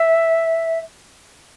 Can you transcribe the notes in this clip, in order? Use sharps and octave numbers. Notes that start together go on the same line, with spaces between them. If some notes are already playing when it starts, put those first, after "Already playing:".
Already playing: E5